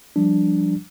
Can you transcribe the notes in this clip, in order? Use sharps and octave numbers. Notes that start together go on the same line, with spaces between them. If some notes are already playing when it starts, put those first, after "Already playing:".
F3 G3 D4